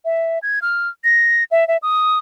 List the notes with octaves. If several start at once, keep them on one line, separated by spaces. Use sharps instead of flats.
E5
G#6
F6
A#6
E5
E5
D#6